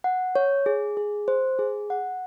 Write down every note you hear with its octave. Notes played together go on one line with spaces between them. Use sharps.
F#5
C#5
G#4
G#4
C5
G#4
F#5